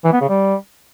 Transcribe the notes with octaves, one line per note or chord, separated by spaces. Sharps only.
E3
B3
C#3
G3